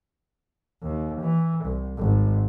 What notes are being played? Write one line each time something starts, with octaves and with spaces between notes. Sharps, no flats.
D#2
E3
C2
G#1